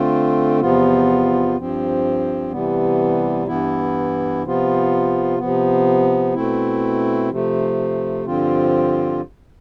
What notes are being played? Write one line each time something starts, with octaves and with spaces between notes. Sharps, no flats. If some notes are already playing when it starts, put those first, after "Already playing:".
Already playing: D3 A3 C4 F4
E2 C3 F3 B3 F4
G2 F3 C4
C3 E3 G3 B3
G2 E3 B3 E4
C3 F3 B3 F4
C3 F3 B3
B2 A3 C4 E4
C3 F3 A3
G2 D3 F3 C4 F4